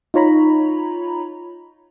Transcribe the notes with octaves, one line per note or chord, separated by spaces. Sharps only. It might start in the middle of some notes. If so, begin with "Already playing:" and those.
D#4 F4 C#5 A#5 B5